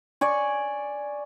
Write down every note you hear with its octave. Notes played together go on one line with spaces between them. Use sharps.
D5 G#5 C#6